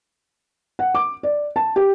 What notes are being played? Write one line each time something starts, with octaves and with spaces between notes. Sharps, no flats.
F#5
D6
D5
A5
G4